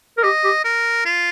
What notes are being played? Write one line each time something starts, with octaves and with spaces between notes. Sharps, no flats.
A#4
G4 D#5
G4
A#4
F4